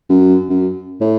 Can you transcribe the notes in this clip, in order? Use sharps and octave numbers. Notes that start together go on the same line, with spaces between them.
F#2
F#2
A2